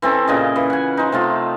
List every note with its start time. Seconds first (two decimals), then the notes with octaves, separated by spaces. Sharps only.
0.02 E3 C4 C#4 A4
0.28 A#2 C#3 D#5
0.56 E3
0.70 F#5 G#5
0.97 D#4 C5
1.12 C3 A3 F4